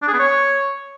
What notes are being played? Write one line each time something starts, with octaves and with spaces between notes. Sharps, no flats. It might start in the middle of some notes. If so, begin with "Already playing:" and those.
D4
G#4
B3
C#5